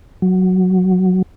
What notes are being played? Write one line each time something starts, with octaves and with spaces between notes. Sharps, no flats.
F#3